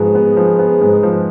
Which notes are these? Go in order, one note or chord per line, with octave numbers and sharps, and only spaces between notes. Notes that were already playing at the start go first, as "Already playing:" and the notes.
Already playing: G#2 F3 B3 F#4 G#4
B3
F3
B3
G#2
F3